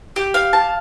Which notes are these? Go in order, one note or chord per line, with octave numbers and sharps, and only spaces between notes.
G4
F5
A5